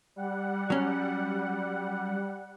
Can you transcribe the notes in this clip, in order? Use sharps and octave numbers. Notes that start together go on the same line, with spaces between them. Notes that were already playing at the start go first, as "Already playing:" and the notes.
G3 F#5
F#3 C#4